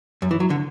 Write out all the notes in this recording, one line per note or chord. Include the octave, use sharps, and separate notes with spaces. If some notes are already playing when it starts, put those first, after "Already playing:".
F#2
E3
F#3
D3